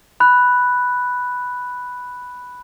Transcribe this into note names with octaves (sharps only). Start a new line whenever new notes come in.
B5 F#6